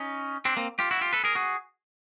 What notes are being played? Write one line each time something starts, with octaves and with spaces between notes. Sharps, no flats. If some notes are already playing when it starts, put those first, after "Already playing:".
Already playing: C#4 D#4
C4 D4
A#3 C4
F4 G4
E4 F#4
F4 G4
A4 B4
G#4 A#4
F#4 G#4